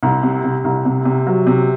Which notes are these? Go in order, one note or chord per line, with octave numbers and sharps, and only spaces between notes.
C2
C3
C3
C2
C3
C3
F#3
C3